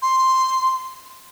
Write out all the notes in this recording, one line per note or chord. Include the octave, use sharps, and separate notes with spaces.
C6